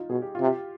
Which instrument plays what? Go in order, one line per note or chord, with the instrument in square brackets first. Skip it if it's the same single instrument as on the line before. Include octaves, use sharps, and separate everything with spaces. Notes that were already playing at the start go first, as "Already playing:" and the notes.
Already playing: [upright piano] D#4 F4
[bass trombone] B2 [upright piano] G#4
[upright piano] G4
F4
[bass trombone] C3
[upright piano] G4